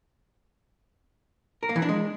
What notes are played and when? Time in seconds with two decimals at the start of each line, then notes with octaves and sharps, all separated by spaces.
1.63 A#4
1.69 A#3
1.76 E3
1.82 D4
1.89 G#3